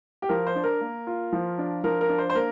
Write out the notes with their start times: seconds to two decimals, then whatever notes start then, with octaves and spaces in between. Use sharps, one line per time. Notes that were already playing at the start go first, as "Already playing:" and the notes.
0.22 G4
0.29 F3 A#4
0.47 C5
0.55 D4
0.64 A#4
0.81 A#3
1.07 F4
1.32 F3
1.58 D4
1.84 F3 A#4
2.01 A#4
2.09 D4
2.18 C5
2.30 C5
2.35 A#3 A#4